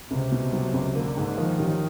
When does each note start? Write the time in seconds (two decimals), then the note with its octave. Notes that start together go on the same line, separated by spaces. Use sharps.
0.11 C#2 C3
0.31 B2
0.53 F#3
0.73 C#2
0.95 D3 A#3
1.17 G#2
1.38 D#3 F3
1.59 A1